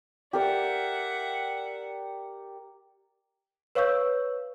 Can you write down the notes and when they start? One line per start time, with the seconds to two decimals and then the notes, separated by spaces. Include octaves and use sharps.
0.33 G4 A#4 D5 E5 F#5
3.75 B4 C#5 F5 C#6 E6 G6